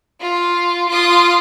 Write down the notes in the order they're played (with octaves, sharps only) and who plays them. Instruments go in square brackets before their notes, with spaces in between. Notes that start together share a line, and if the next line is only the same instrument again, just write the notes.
[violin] F4
F4 D#6